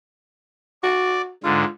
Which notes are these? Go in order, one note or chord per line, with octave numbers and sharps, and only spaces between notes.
F#4 D5
G#2 D3 F4